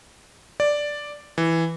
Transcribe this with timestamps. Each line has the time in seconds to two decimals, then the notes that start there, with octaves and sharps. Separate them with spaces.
0.60 D5
1.38 E3